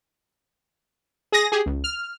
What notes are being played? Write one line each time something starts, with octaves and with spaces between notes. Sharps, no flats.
G#4 D#6 A#6
G4 G#4
C#2
F6